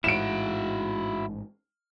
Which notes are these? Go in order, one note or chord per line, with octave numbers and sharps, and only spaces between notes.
A1 G#2 E4 F#4 D7 E7